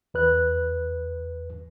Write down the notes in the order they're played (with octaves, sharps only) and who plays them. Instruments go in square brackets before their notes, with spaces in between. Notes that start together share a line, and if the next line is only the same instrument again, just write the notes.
[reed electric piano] E2 B4 F#6